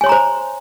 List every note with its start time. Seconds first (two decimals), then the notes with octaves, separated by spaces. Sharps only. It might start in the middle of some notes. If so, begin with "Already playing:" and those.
0.01 G#5
0.04 C#5
0.06 C6
0.09 A#5
0.12 C5